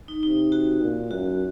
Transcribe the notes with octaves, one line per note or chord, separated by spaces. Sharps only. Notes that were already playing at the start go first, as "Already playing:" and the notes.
D#4
C3 D#4
F#4
A#2
F#2 F#4